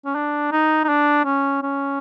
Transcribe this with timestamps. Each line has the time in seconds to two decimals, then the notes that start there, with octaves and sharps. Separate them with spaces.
0.05 C#4
0.15 D4
0.52 D#4
0.84 D#4
0.89 D4
1.25 C#4
1.62 C#4